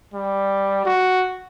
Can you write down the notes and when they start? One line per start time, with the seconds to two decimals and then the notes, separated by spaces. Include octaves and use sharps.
0.14 G3
0.86 F#4